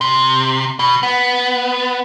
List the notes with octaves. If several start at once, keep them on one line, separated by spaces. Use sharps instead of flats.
C3
B2
B3